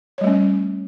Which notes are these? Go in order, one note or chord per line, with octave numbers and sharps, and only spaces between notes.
G3 A3 C#4 C#5